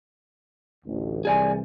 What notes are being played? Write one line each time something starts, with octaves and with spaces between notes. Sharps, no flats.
A1 D2
C2 E3 G#4 D5 G#5